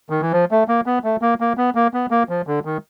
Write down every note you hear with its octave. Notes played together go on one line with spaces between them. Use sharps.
D#3
E3
F3
A3
A#3
B3
A3
A#3
A#3
B3
A#3
B3
A#3
F3
D3
D#3